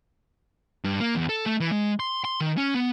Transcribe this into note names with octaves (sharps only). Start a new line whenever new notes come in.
G2
A#3
E2
A4
A3
E3
G#3
C6
C6
D#3
C#4
B3